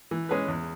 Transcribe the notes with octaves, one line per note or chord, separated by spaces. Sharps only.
E3
G#3 C#4 G#4 B4
E2